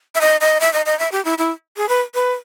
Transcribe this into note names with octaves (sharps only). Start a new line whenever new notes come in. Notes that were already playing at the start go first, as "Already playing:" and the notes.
E5
D#5
D#5
E5
D#5
D#5
E5
G4
E4
E4
G#4
B4
B4